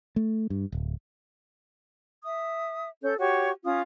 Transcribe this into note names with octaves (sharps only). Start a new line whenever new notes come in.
A3
G2
D1
E5 D#6
C#4 A4 G6
F#4 G4 C#5 C#6
C#4 F4 D#6